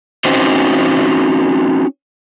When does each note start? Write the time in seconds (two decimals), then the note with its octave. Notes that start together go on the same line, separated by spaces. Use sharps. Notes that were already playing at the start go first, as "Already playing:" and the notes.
0.25 C4 C#4 D#4 F#4 C5